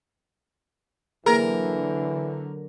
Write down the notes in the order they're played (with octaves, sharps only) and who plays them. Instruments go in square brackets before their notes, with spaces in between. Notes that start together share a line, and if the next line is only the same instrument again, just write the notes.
[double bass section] D3 F#3 [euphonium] E3 [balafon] A#3 G#4 [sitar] A#4